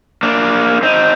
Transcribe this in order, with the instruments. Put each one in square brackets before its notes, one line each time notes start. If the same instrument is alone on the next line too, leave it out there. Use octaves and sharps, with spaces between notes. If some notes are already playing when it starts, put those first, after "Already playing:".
[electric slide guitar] A#3 D4
C4 D#4